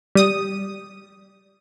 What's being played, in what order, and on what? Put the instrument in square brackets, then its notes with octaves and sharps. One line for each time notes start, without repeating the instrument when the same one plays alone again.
[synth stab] G3 D#6